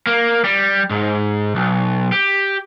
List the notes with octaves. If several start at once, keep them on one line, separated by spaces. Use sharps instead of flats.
A#3
G3
G#2
B1
G4